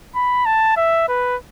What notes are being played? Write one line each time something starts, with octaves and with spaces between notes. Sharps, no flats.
B5
A5
E5
B4